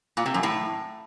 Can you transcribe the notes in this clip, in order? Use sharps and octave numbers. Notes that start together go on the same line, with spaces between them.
A#2
C3
F#2
A2